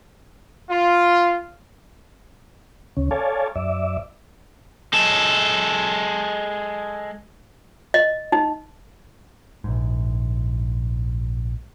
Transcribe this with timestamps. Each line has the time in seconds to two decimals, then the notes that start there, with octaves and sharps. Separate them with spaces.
0.68 F4
2.97 D2 C#3 C#4
3.11 A4 C#5 D5 F5 G#5 A5
3.56 F#2 D5 E5
4.93 G#3 A4
7.94 D#5
8.32 D#4
9.64 A#1 G#2